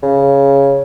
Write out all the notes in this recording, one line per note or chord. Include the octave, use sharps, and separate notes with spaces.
C#3